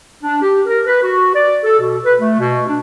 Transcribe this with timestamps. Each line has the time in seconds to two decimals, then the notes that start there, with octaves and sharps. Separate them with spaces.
0.23 D4
0.42 G4
0.66 A#4
0.86 B4
1.02 F#4
1.34 D5
1.64 A4
1.80 B2
2.05 B4
2.20 A3
2.39 B2
2.67 D4